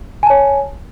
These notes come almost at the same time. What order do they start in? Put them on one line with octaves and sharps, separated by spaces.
G#5 A5 C#5